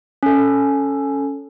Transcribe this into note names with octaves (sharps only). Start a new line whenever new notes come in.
C#4 A4